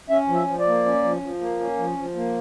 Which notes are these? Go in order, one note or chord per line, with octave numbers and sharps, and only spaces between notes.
C#4 E5
F3
E5
F3
D5
A#3
C#4
F3
F3
A#3
C#4
F3
F3
A#3